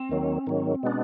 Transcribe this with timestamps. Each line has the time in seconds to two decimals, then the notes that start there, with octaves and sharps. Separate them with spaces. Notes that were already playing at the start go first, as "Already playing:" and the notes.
Already playing: C4
0.09 D#2 D#3 F#3
0.47 G#2 D#3 F#3
0.83 B2 G#3 B3 D4